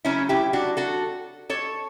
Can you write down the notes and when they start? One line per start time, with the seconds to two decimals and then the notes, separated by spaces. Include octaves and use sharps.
0.05 C#3 F#3 A3 C#4 E4
0.29 E4 G4
0.53 D4 F#4
0.77 F#4 A4
1.49 A4 C#5